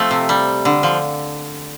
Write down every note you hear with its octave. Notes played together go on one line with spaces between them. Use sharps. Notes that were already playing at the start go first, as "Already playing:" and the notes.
Already playing: F3 A3 C4
C3
G3
D3
F3